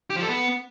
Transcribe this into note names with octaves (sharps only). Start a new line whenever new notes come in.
G4
F3
A4
B3